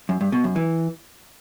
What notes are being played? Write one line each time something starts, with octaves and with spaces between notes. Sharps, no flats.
F#2
G2
B2
F#2
E3